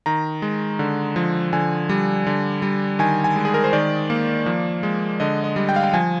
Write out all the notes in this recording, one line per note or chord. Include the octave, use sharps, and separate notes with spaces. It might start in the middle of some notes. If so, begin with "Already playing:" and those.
D#3 A#5
G#3
D3
F3
D3 G#5
G3
D3
G3
D#3 G#5
G#5
G#3
G#4
A#4
C5
D#3 D5
A#3
F3
G#3
D3 D#5
D#5
G3
G5
F5
G5
F3 G#5